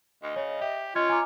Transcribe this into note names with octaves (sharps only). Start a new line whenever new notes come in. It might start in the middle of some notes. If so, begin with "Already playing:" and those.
D2 D#5
C#3 C#5
G4 E5
C#4 F4 D#5 G#6
G#5 A#5 D6